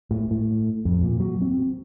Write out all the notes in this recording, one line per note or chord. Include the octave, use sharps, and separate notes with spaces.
A2
A2
F2
A#2
F#3
C4